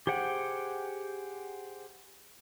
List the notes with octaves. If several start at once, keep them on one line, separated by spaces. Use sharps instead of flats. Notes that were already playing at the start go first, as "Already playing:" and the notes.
G4 G#4 C5 F#5 G5